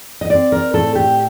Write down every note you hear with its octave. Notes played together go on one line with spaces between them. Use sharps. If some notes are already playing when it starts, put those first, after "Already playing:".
D#5
C4 D5
A#4
A2 A4
G4